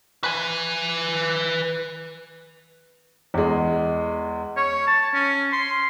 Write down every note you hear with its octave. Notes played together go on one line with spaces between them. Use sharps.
B4 G#5
E2 G#3
C#5
A5
C#4
C6